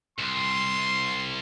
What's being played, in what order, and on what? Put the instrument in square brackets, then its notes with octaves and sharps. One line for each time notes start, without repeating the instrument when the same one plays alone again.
[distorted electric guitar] C2 [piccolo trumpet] C6